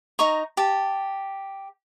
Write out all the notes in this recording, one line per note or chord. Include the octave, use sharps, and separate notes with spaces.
D#4 A#5 C#6
G4 A5